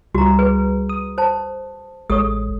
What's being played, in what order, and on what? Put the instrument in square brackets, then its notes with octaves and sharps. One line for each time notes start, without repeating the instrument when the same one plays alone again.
[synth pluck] C#2 G3 [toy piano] F#4 A#5
[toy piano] G#4 B4
[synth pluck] D#6
[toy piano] C5 A5
[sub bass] A1 [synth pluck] G#3 C#5 [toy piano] G4 A4 D#6